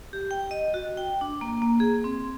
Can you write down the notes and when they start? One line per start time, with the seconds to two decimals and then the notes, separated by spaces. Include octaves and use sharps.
0.13 G4
0.31 G5
0.51 D#5
0.74 F#4
0.97 G5
1.21 D4
1.41 A#3
1.62 A#3
1.80 G#4
2.04 C4